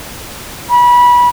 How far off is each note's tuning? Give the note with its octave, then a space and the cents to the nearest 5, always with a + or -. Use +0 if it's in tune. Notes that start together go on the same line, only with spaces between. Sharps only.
B5 -25